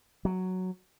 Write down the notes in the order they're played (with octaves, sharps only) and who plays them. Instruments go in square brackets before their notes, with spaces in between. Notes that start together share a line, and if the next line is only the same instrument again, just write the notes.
[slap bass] F#3